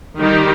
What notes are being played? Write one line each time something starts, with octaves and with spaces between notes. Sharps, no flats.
D#3 G3 D#4 G4